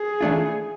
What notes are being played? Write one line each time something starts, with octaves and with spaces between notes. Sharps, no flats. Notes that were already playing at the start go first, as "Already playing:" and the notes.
Already playing: G#4
E3 A3 D4 F4